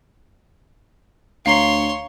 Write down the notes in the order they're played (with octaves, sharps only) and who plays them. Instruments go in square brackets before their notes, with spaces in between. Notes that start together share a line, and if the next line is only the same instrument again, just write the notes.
[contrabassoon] D2 [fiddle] C#5 C6 [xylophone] F5 A#5 C7